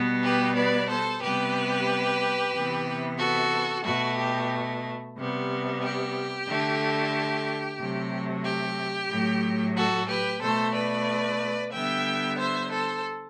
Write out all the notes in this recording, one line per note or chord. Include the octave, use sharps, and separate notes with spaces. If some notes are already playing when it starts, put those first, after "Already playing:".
Already playing: B2 G3 B3
G4 B4
B4 D5
A4 C5
C3 G3 B3 G4 B4
C3 E3 B3
F#4 A4
B2 A3 F#4
G4
C3 G3 B3
G4
D3 A3
C3 F#3 A3
G4
A2 F#3 A3
F#4 A4
G4 B4
B2 A3 A4 C5
B4 D5
D3 G3 B3 E5 G5
C5 E5
A4 C5